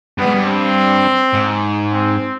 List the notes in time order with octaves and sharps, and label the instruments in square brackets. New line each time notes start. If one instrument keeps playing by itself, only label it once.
[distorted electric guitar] G2 [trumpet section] B3
[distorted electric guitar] G#2
G2
[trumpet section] C4
[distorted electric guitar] G#2
[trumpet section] C4